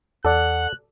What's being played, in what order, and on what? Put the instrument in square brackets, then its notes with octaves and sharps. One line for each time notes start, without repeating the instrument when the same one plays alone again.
[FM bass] E2 [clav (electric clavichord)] A4 D5 [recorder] F#5 [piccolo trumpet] F#6